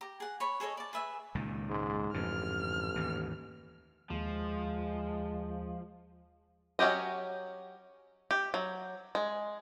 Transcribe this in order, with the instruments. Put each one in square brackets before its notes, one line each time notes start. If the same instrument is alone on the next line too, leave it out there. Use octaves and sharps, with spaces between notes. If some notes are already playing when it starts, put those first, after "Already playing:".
[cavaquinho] G4 A#5
G#4 F#5
C#5 B5
G#4 A4 C#5 D#5
D5 A5
G#4 B4 E5 G#5
[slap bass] C#2 A#2 D#3
[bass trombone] G#2
[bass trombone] A1 [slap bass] F2 G#2 D3 [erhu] F6
[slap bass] D#2 G#2 E3
[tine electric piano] D#2 [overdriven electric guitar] F3 [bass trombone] G#3
[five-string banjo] F#3 C#4 F#4 G4 D#5
G4
F#3
G#3